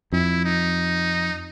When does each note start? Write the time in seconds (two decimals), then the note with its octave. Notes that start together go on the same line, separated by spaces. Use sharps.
0.12 F2 E4
0.44 D#4